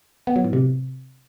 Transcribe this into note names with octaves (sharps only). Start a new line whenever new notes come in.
B3
F#3
A2
C3